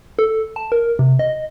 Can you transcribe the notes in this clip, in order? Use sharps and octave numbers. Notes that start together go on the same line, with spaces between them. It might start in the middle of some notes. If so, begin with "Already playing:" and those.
A4
A5
A#4
C3
D#5